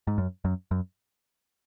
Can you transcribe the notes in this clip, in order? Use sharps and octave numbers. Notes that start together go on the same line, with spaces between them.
G#2
F#2
F#2
F#2